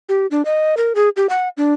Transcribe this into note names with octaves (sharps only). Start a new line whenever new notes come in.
G4
D4
D#5
A#4
G#4
G4
F#5
D4